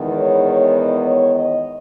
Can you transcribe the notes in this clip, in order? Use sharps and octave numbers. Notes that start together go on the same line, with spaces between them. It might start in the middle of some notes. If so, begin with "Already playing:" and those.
Already playing: E2 D#3 G#3 B3
C#5
C#5
D#5
C#5
D#5